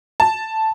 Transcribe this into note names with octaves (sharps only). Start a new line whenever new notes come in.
A5